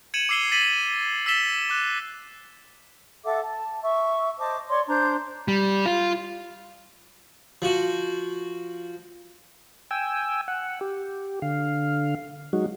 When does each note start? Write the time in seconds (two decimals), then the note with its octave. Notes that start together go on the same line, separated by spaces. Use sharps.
0.14 G#6 C#7 D#7 E7 F#7
0.29 D6 E6 C7 E7 G7
0.52 A6 B6 D#7 F#7
1.26 E6 A6 B6 E7 G7
1.70 D6 F#6
3.24 A4 E5 F#5 D6
3.42 A5
3.82 E5 C#6
4.38 C5 D#5 A5 D6
4.69 C#5 D5 C6 D6
4.88 D4 C5 A#5 G6
5.48 G3
5.86 F4
7.62 F3 F#4
9.91 G5 G#5 E6
10.48 F#5
10.81 G4
11.42 D3 F5
12.53 F#3 G#3 D#4 F#4